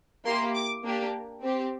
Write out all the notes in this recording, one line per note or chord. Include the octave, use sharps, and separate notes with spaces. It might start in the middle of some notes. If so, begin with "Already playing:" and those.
A#3 E4 G4 C6
D6
A#3 D4 G4
C4 G4